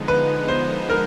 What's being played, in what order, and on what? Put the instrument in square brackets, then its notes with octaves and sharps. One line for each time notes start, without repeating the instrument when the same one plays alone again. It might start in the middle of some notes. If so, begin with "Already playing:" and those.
Already playing: [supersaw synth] D3 F3 G#3 B3 D#4
[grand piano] B4
C5
A#4